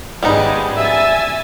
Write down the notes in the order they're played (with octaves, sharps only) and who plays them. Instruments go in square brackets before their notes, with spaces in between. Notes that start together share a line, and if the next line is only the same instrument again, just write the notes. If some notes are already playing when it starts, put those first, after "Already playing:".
[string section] G#1 C#3 G#3 [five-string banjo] G3 B3 D#4
[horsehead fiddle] E5 [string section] G#5 E6 A6